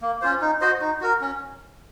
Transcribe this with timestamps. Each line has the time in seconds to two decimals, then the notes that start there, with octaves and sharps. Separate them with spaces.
0.02 A#3
0.22 C#4 F4 C5
0.41 D#4
0.61 F#4 C5 D#5
0.81 D#4
1.01 F#4 A#4
1.21 C#4